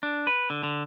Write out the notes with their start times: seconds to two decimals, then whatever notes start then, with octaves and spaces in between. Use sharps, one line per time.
0.03 D4
0.27 B4
0.50 D3
0.63 D3